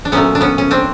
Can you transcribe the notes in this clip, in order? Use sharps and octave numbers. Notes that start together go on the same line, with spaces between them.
D4
A#2 F#3 A3 B3 C#4
D4
B3 C#4
C#4
C4 D4